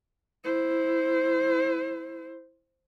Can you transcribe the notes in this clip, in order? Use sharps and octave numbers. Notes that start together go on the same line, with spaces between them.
E4 C5